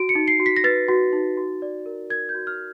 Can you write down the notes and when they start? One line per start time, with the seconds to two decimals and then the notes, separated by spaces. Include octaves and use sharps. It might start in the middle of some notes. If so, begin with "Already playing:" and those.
Already playing: F#4 D7
0.09 C#7
0.15 D#4
0.28 C7
0.40 F#4
0.46 B6
0.56 A#6
0.64 B4 A6
0.88 F#4
1.12 D#4
1.37 F#4
1.62 D5
1.86 A#4
2.10 A#4 G#6
2.29 G6
2.35 F#4
2.47 F6